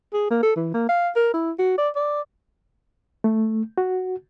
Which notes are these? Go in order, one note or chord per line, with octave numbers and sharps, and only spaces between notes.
G#4
A#3
A4
E3
A#3
F5
A#4
E4
F#4
D5
D5
A3
F#4